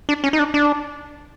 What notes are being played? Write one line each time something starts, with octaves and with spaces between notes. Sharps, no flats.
D4
C#4
D#4
D4
D4